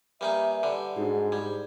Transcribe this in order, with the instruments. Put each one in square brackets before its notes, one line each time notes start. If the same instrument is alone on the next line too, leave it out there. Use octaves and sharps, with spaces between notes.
[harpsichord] G3 A#3 D#4 [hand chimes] B4 D5 G#5 [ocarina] E5
[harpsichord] D3 G3
[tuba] G#2 [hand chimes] D4 D#4 F#4 [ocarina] G#4
[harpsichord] G3 [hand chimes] G#6